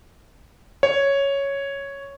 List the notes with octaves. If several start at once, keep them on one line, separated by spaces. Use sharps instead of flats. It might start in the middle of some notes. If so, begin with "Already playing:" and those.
C#5